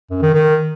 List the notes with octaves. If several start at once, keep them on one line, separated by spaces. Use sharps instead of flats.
F#2
D#3
D#3